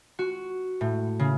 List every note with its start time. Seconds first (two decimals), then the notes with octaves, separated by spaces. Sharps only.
0.19 F#4
0.81 A2
1.19 C#3